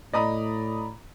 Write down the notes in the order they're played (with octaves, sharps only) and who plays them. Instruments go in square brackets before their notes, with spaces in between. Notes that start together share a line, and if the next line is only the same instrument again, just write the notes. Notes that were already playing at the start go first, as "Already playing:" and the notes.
[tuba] A2 [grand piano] D5 A#5 B5 [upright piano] D#5 D#6